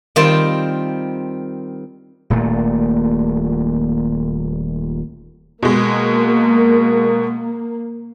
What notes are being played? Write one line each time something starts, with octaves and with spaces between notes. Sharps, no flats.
D#3 G3 C4 F4 C5 A5
D#1 A#2 A3
B2 G#3 A#3